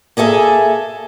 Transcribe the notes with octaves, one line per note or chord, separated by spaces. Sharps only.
A#3 G#4 A4 E5 G#5